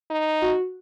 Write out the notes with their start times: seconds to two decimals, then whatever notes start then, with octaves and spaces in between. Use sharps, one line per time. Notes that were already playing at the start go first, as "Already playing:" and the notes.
0.11 D#4
0.42 F#4